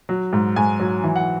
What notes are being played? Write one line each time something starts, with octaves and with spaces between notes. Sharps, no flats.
F#3
G#2
G#2 G#5
F#3
E3
F#5